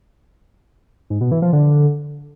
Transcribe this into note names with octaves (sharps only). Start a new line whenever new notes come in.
G#2
B2
E3
F3
D3